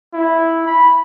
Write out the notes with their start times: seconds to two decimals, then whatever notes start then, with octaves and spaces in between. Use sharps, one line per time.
0.14 E4
0.67 B5